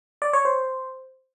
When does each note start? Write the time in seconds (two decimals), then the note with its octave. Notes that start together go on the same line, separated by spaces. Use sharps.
0.22 D5
0.33 C#5
0.45 C5